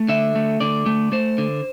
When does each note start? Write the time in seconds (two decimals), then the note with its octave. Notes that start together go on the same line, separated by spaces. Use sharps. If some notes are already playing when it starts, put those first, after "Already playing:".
Already playing: A3
0.09 D3 E5
0.36 A3
0.60 D3 D5
0.86 A3
1.12 A3 C5
1.38 D3